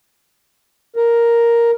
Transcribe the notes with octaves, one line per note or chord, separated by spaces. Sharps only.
A#4